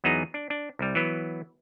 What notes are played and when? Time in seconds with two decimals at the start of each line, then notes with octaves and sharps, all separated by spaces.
0.04 E2 F#3 B3 D#4 G#4 A#5
0.34 D4
0.50 D4
0.79 C2 G3
0.95 E3 F#3 B3